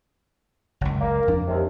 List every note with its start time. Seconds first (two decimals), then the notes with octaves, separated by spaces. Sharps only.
0.81 F#1 C#2
1.01 A#3
1.28 F2 D4
1.48 D#2 C3